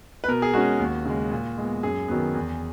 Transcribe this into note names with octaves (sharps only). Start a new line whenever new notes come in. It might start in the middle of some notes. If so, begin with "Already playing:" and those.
B4
B2 A#4
G#4
G#3 C#4 F#4
D#2
C#3 G#3
A#2
G#3 B3
F#2 G#4
D#3 F#3 B3
E2